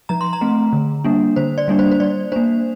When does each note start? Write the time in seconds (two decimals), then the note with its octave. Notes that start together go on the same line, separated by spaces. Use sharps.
0.09 F3 A#5
0.21 C6
0.33 A#5
0.41 A3 C4
0.73 D3
1.04 G3 A#3 D4
1.36 D3 C5
1.58 D5
1.68 G3 A#3 D4
1.79 C5
1.91 C5
2.00 G3 D5
2.32 A#3 D4 C5